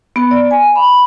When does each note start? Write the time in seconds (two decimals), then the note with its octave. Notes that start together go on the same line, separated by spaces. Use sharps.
0.16 B3
0.31 D5
0.51 G#5
0.76 B5